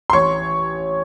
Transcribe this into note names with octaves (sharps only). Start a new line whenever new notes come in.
C6
A1 C#5 C#6